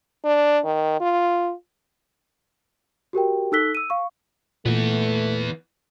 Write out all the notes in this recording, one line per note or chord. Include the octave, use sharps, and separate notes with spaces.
D4
D#3
F4
F#4 G4 A#4 G5
D#4 A4 E6 F#6 B6 G7
E6 D#7
F5 C#6
A#2 E3 A3 B3